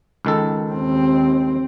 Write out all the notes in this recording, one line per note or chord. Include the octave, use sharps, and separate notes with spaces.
C#2 D#3 A4
D#2 C4